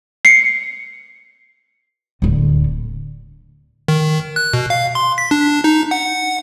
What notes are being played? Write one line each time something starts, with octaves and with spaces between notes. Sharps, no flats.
C7 C#7
D1 D3
D#3
F#6
B2
F5
C6
B6
D4
D#4
F#5